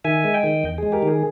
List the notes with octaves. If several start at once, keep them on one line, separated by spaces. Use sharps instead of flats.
D#3 E5 G#5
G#3
D#5 G5
D#3
E2
G#3 G#4
G4 A#4
D#3 G#4